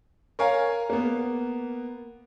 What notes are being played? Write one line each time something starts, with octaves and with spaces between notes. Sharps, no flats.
A#4 C#5 F5 G#5
A#3 B3